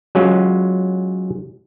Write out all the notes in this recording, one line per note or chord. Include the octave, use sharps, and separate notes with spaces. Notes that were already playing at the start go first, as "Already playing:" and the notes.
F#3 G#3 C#4 F4